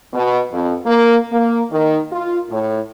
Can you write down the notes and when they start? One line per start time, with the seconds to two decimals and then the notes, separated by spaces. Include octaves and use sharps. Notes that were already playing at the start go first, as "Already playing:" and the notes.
0.13 B2
0.51 F2
0.86 A#3
1.31 A#3
1.72 D#3
2.12 F4
2.50 A2